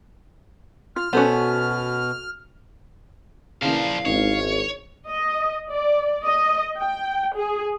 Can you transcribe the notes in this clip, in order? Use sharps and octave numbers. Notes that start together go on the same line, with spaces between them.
F4 F6
B2 B3 C#4 F#4 A4 C5
A#2 C#3 E3 F3 A#3 F5
G#1 E3 C#4 D#4 C#5
D#5
D5
D#5
G5
G#4